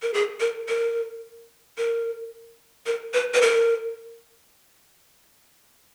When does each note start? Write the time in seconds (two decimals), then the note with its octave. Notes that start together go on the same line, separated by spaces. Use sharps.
0.02 A#4
0.14 G#4
0.40 A#4
0.68 A#4
1.78 A#4
2.86 A#4
3.14 B4
3.34 B4
3.41 A#4